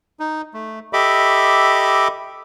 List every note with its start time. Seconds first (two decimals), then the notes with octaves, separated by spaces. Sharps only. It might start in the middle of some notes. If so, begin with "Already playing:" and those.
0.20 D#4
0.54 A3
0.93 G4 A4 D#5 E5 B5 D6